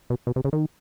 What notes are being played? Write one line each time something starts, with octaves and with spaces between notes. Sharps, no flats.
B2
B2
C3
C#3
D#3